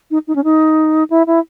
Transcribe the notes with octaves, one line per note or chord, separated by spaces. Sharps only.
D#4
D#4
C#4
D#4
E4
E4